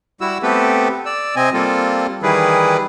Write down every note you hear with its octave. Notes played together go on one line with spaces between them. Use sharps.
G3 E4 F#4 E6
A3 B3 C4 G4 A4 B4
D5 E6
C3 C4 D#5 G#5
G3 A#3 C4 F4 A4
D#3 E3 G3 E4 G#4 B4